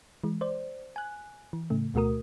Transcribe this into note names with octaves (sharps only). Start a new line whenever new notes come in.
E3 G#3
C5 D5
G#5 F#6
E3
A2 C#3 A3
D2 B2 A3 F#4 A#4 D#6